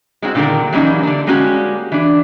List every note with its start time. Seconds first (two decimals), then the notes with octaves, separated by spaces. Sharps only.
0.22 G#3 C4 D4 F#4
0.35 A#2 D3 D#3 G3 A#4
0.72 E3 F#3 G3 A#3 C#4 D#4
1.03 D3 D4
1.27 G3 G#3 A#3 C#4 F#4 G4
1.92 E3 D4